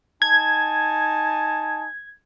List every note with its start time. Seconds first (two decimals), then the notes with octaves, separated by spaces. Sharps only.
0.22 D#4 G#5 A5 G#6